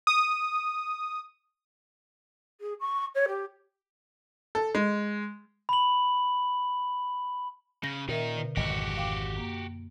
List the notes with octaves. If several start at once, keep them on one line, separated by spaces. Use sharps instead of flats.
D#6
G#4
C#6
C#5
G4
A4
G#3
B5 F#7
C#3 G6 A#6
A#2 D#3 C#4 D#4 A#4 E5
B2 D3
G#1 F2 F#4 G4 D#5
F5 G5 D6
F#2 A#3